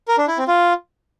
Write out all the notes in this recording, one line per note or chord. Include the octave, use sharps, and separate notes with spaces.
A#4
D4
E4
C4
F4